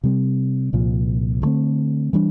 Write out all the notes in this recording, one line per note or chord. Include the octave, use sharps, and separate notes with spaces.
C3 G3 C4
C2 A#2 F3
D2 D3 A3 C4
E3 G3 D4